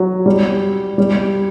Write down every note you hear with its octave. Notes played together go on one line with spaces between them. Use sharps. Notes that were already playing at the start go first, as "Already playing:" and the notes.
Already playing: F#3
G3
G3